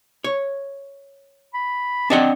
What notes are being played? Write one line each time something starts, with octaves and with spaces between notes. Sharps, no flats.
C#5
B5
C4 D4 D#5 F#5